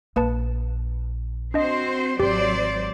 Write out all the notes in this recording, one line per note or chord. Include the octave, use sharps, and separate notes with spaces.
A#1 A#3 B4 A5
C4 D4 F#4 C5 D#5
G#1 F#3 G4 C5 D5